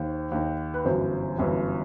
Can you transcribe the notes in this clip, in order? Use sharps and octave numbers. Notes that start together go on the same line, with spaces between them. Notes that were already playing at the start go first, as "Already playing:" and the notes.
Already playing: D#2 D#3 C5
D#2 D#3
B4
G1 F#2 E3 C5
G1 F#2 E3